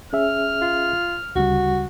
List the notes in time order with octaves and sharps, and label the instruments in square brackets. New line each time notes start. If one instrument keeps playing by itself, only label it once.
[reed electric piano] C#4 G#4 E5 [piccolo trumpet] F6
[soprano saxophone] F4
[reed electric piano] D2 C#3 G3 [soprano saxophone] F#4